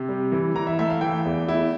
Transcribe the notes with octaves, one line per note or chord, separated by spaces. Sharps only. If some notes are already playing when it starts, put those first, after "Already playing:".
Already playing: C3
G3
E3
E3 A#5
E5
A3 E5
F5
E3 G5
E2
E4